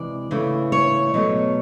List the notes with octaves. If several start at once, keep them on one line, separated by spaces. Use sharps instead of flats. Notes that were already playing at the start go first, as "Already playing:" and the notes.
Already playing: C3 E3 G#3 D5
C#3 E3 A3
C#5
B2 F#3 A3